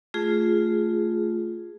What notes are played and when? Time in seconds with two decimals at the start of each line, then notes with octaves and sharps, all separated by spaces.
0.14 A3 F4 G#4